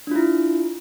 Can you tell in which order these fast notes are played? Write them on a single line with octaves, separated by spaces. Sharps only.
D4 F4 E4